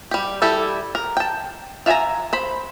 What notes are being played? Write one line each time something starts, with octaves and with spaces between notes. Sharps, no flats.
G3 G4
G3 E4 G4 A4
A#4
G5 A5
F4 E5 G5 G#5 A#5
C5 B5